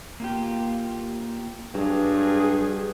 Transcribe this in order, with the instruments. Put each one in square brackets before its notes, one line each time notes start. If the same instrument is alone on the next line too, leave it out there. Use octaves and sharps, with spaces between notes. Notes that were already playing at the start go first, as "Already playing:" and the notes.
[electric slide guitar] A#3 F4 G4
[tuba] G2 [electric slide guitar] F#3 [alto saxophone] G#4